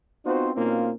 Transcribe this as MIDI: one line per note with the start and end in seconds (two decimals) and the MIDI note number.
0.25 0.51 59
0.25 0.51 60
0.25 0.51 63
0.25 0.51 65
0.25 0.51 66
0.25 0.51 72
0.55 0.91 47
0.55 0.91 58
0.55 0.91 60
0.55 0.91 61
0.55 0.91 63
0.55 0.91 65